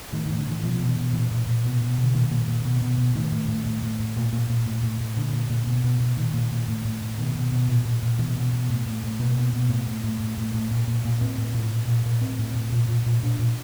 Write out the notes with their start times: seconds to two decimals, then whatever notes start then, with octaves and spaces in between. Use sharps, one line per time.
0.13 A2 D#3
0.26 A2 D#3
0.38 D3
0.47 A2 E3
0.63 B2 F3
0.80 B2
0.88 E3
0.96 B2
1.13 A#2 E3
1.31 A#2
1.47 A#2
1.65 B2
1.81 B2
1.98 B2 D3
2.14 A#2 D#3
2.31 A#2
2.47 A#2
2.65 B2
2.82 B2
2.98 B2
3.15 A2 D#3
3.32 A2
3.48 A2
3.66 A2
3.82 A2
3.99 A2
4.16 A#2
4.33 A#2
4.50 A#2
4.66 A2
4.83 A2
5.00 A2
5.17 A#2 D3
5.33 A#2
5.50 A#2
5.67 B2
5.84 B2
6.00 B2
6.17 A#2 D#3
6.34 A#2
6.51 A#2
6.68 A2
6.85 A2
7.01 A2
7.18 B2 D#3
7.35 B2
7.51 B2
7.68 A#2
7.85 A#2
8.03 A#2
8.19 B2 E3
8.36 B2
8.53 B2
8.69 A2
8.86 A2
9.03 A2
9.19 B2 A#3
9.36 B2
9.53 B2
9.69 A2
9.87 A2
10.04 A2
10.20 A2
10.37 A2
10.54 A2
10.71 A#2
10.87 A#2
11.05 A#2
11.21 A2 C4
11.38 A2
11.54 A2
11.71 A#2
11.88 A#2
12.06 A#2
12.21 A2 C4
12.39 A2
12.55 A2
12.72 A#2
12.88 A#2
13.06 A#2
13.23 A#2 D4
13.39 A#2